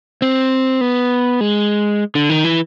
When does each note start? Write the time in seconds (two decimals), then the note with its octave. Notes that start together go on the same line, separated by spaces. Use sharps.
0.22 C4
0.81 B3
1.41 G#3
2.15 D3
2.29 D#3
2.44 E3